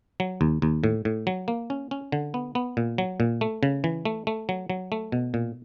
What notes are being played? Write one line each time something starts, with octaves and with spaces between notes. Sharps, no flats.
F#3
D#2
D#2
A2
A2
F#3
A#3
C#4
C#4
D3
B3
B3
A#2
F#3
A#2
A3
C#3
E3
A3
A3
F#3
F#3
A3
B2
A#2